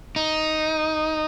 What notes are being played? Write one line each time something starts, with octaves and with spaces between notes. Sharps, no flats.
D#4